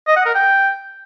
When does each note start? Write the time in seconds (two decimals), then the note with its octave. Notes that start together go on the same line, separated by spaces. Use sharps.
0.07 D#5
0.17 F#5
0.26 A#4
0.35 G5